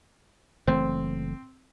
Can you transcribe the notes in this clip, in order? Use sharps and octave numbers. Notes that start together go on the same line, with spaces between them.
F#1 E3 A3 C4